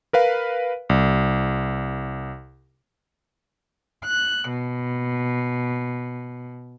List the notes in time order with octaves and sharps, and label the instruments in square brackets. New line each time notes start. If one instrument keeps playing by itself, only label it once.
[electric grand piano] A#4 B4 F5
C2
[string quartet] F#6
B2